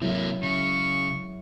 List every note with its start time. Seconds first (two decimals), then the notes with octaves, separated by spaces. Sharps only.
0.02 C3 F#3 G#3 A#3 E4
0.43 C#3 C#6